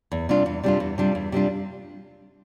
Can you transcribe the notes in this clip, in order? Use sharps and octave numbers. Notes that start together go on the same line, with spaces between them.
E2
C3 G3 D4 F4
E2
C3 G3 D4 F4
E2
C3 G3 D4 F4
E2
C3 G3 D4 F4